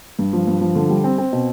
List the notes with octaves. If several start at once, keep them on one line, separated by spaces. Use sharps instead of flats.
G2
F3
G2
F3
D3
G3
C4
C4
B2